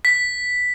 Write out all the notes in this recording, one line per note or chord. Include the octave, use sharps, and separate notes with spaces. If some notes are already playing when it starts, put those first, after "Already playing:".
B6